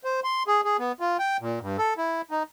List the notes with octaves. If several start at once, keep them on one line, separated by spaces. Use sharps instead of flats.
C5
C6
G#4
G#4
B3
F4
G5
A#2
G2
A4
E4
D#4